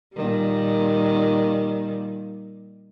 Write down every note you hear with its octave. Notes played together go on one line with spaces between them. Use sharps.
A#2 D#3 G3